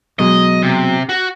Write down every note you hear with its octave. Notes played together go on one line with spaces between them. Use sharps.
B2 F#3 G#3 D#5
C3
F#4